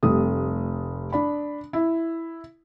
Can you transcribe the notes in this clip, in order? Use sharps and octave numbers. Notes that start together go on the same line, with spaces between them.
F1 G3 A3 D#6
D4 B5
E4